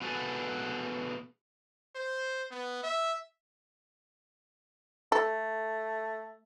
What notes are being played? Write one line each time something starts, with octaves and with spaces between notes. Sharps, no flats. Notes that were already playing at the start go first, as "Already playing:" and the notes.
B3 F#4 G#4 A4 B4
C5
B3
E5
A3 A4